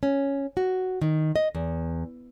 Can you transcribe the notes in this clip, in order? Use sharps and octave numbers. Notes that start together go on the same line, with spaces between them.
C#4
F#4
D#3
D#5
E2